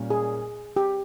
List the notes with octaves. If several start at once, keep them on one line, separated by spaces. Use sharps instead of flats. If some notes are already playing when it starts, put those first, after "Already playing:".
Already playing: A#2 G3 C#4
G#4
G4